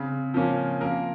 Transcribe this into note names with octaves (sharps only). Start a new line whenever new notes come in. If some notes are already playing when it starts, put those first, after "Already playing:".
Already playing: C#3 C4
F3 A#3 C#4
F3 A#3 A#4